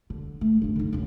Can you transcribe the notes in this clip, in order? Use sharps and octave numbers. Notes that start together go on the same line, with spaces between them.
D3
A3
G2 C#4
D3 D#4
F1 C#3